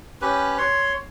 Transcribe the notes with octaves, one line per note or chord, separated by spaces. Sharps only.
C#4 G4 B4
C#5 C6